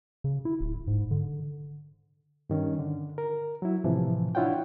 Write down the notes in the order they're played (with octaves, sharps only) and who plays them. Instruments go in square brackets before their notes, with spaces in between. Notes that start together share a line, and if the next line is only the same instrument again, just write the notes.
[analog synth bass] C#3
E4
D1
G#2
D3
[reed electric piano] G2 D#3 C#4
D3
A#4
F#3 E4
A2 C3 E3 F3
D4 E4 F4 C#5 F#5 G5